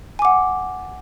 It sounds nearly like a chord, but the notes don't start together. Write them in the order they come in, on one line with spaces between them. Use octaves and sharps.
G#5 D6 F#5